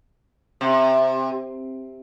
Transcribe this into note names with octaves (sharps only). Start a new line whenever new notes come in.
C3